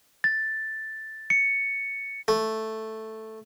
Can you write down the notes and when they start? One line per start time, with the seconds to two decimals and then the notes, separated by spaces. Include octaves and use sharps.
0.24 A6
1.30 C#7
2.28 A3